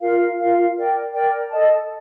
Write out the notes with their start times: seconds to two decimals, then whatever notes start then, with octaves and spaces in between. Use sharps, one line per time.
0.01 F4 A#4 F5
0.38 F4 A#4 F5
0.76 A#4 D5 G5
1.12 A#4 D5 G5
1.50 A4 D#5 A5